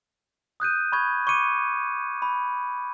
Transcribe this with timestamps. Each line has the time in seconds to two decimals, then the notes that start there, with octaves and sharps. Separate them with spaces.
0.60 D#6 F#6 G6 D#7
0.92 B5 C#6 G#6
1.26 B5 C#6 D6 C#7 D#7
2.22 B5